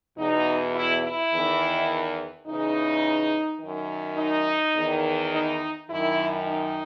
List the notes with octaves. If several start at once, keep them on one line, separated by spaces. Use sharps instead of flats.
E2 B2 D#4
E4
E4
E2 D#3
E2 C#3 E3 D#4
F#2 D#3
D#4
E2 D#3
D#4
F#2 D#3 E4
D#4